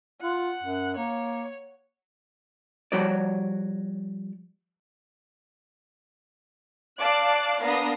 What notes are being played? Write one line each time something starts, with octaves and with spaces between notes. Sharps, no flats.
F4 F#5
F#2
A#3 C#5
F3 G3 F#4 C#5 D5
D5 F5 A5 D6 F#6 A6
A#3 B3 D4 F5 A#5 D#6